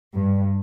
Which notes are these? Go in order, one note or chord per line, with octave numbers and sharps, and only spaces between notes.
G2